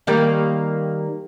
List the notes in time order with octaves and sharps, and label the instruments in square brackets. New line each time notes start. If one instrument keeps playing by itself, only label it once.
[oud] D#3 G3 A#3